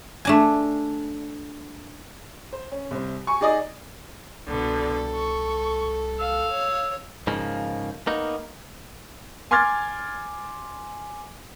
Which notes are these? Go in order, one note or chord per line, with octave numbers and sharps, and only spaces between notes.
A3 D4 G#5
C5
C#4
C2 C5
G#5 C#6
D#4 G#4 D5 D#5
C2 B2 D3 A4
C#6
F5 E6
C#5
G#2 C#3 F3 A#3
A#3 B3 D#4
G#5 C6 D6 F6 G#6 A6